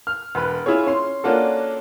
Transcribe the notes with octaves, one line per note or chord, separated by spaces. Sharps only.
F6
E1 B4
C#4 E4 F4 G#4 C#5
C#4 C6
A#3 C#4 D4 F4 F#4 A4